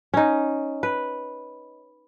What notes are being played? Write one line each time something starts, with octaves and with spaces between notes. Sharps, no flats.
C#4 D#4
B4